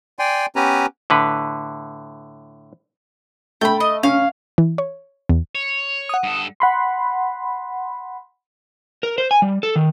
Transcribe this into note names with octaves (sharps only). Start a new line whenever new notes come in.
D5 G5 G#5 C6
B3 C#4 G4 B4 G#5 A#5
A2 D3 B4
A3 G5 B5
D#5
C#4 F5
E3
C#5
E2
C#5
F#5 D#6
G2 A4
F#5 B5 C6
A#4
C5
G#5
G3
A4
D#3